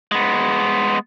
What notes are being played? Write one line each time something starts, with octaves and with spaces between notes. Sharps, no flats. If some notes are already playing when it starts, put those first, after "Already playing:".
G#3 B3